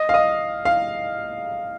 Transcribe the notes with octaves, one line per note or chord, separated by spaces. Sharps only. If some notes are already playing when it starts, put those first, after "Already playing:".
Already playing: D#5
F5
D#5
F5